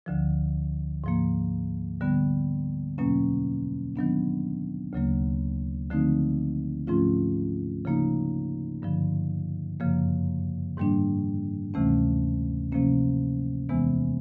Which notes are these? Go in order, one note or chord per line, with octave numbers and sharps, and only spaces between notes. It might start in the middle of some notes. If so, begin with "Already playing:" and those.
D2 D3 F3
G#2 F3 A#3
D3 G3 B3
E2 B2 F#3 A#3 C#4
D#3 F#3 B3 D4
D2 C#3 F#3 A#3
D3 F3 A3 C4 D#4
G#2 F3 A3 C#4 F4
C#3 F3 A#3 D#4
G2 D3 F3
F#2 C#3 F3 A#3
G#2 D#3 G3 A#3 D4
D2 C3 E3 A3 C#4
C3 F3 A#3 C#4
E2 C3 E3 G#3 B3